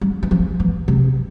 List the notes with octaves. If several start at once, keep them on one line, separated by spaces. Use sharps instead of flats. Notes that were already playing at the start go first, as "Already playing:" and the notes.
G3
E3
F3
E3
C3